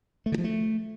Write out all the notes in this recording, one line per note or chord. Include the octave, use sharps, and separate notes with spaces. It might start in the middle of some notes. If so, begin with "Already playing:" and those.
A3
D3
F3
A3